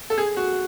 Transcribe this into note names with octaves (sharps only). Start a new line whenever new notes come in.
A4
G#4
F#4